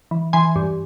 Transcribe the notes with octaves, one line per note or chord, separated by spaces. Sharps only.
E3
E3 G#5 C6
G2